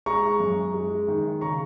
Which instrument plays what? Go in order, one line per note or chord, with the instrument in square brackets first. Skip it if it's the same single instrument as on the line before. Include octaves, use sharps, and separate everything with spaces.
[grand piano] G#3 A#5 C#6
F#2
G#3
D#3
C#3 A#5 C#6